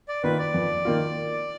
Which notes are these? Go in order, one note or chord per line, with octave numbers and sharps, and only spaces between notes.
D5
D#3 A#3 F4 B4
D5
F2
D#3 A#3 F4